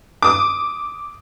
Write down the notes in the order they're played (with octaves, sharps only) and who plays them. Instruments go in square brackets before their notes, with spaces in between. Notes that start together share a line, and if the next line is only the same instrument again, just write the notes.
[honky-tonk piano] D6 D#6